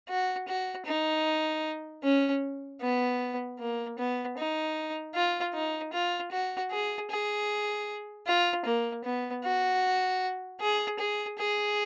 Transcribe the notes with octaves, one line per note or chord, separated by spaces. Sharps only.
F#4
F#4
D#4
C#4
B3
A#3
B3
D#4
F4
D#4
F4
F#4
G#4
G#4
F4
A#3
B3
F#4
G#4
G#4
G#4